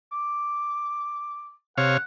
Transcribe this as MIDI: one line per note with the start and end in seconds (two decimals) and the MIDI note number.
0.12 1.54 86
1.78 1.97 48
1.78 1.97 73
1.78 1.97 77
1.78 2.03 78